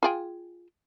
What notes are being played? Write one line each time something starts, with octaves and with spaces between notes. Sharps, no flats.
F4 G#4 G5